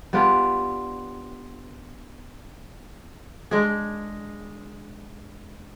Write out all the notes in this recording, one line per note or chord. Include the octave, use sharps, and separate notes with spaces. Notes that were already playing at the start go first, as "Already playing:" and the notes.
G3 B3 D4 F4
G#3 D4 G#4